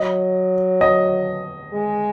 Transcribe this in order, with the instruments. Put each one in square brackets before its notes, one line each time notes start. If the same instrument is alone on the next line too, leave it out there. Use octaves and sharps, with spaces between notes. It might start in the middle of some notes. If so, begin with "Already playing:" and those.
Already playing: [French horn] F#3 [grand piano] D#5
[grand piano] D#5
[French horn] G#3